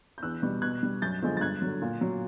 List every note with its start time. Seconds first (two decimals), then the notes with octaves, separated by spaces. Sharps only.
0.18 G6
0.23 E2 E6 F#6
0.42 B2 G3
0.62 B2 F#6 G#6
0.83 G3
1.02 F#2 G6 A6
1.22 D3 F3 G#3
1.37 A6
1.41 G2 F#6 G#6
1.62 D3 F#3
1.82 A#2
2.01 F#3